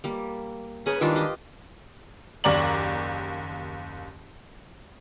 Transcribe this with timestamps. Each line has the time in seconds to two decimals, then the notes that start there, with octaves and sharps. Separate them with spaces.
0.04 G3 A#3
0.86 C#3 C#4 G#4 B4 A#5
1.01 D#3 E3 G3 G#3 D4 F4
1.16 F4 G4 D#5
2.44 F#1 D#2 D5 A#5 F#7